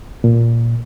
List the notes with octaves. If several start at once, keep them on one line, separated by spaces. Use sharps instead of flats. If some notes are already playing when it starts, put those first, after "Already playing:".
A#2